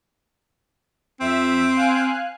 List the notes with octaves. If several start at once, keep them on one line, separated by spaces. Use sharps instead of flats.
F2 C4 E5 E6
F5 G#5 F#6